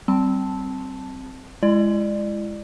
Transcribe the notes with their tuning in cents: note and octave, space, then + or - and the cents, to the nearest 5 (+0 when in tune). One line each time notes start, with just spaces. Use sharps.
G3 -20 C4 +0 A5 +0
G#3 +0 E4 +35 D5 +25